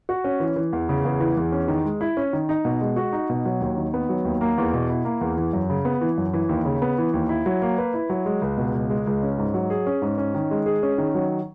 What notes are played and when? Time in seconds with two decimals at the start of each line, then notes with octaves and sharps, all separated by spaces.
0.09 F#4
0.24 C#4
0.40 E3
0.56 E3
0.73 E2
0.89 C#3
1.05 E2
1.20 E3
1.37 E2
1.52 C#4
1.68 D#3
1.85 G#3
2.01 E4
2.17 C#4
2.33 D#3
2.49 D#4
2.65 B2
2.81 G#3
2.96 F#4
3.13 D#4
3.30 B2
3.45 F#3
3.61 D#2
3.77 D#3
3.94 B3
4.09 F#3
4.25 D#2
4.41 A#3
4.58 E2
4.74 B2
4.90 E4
5.05 A#3
5.21 E2
5.37 E3
5.53 F#2
5.70 C#3
5.85 B3
6.01 E3
6.18 F#2
6.34 E3
6.49 D#2
6.65 C#3
6.82 B3
6.98 E3
7.13 D#2
7.29 E4
7.46 F#3
7.62 A#3
7.78 B4
7.94 E4
8.10 F#3
8.26 G#3
8.42 C#2
8.57 B2
8.74 C#2
8.90 G#3
9.07 C#2
9.22 C#4
9.38 G#2
9.54 F#3
9.70 G#4
9.86 C#4
10.02 G#2
10.18 C#4
10.35 D#3
10.51 G#3
10.66 G#4
10.83 C#4
10.98 D#3
11.15 F#3